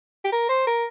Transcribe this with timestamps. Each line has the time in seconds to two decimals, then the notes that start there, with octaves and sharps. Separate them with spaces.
0.25 G4
0.32 A#4
0.49 C5
0.67 A#4